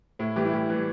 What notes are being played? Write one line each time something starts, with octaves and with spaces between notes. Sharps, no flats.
A2 E4
E3 G3 G4
E4
A2 G4
E3 G3